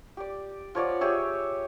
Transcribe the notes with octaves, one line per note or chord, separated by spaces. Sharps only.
G4 D5
F3 C#5 D5 F#5
G4 G#4 C#5 E5